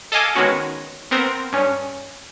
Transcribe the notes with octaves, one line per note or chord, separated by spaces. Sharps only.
A4 D#5 F5 G#5 D6
D#3 G#3 B3 C#4 F#4
B3 C4 A#4
G2 C#4